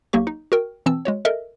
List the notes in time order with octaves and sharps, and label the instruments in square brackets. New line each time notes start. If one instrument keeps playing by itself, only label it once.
[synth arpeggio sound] B1 F#3 A#3 G4 C#6
D#4
F#4 A#4 G5
B2 E3 C4 A5 E6
G#3 F#4 C#5
A4 A#4 D#5 E5